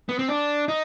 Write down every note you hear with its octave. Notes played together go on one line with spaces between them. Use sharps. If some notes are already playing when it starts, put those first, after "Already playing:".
B3
C4
D4
D#4